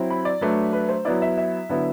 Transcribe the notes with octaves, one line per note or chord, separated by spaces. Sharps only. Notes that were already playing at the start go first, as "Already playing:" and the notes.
Already playing: F#3 C4 E4
B5
D5
F#3 A3 D4 B4
B4
C5
F#3 B3 E4 D5
E5
E5
D3 F#3 B3 E4